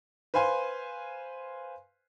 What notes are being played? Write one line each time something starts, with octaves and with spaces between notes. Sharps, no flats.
B4 C5 F5 G#5 C6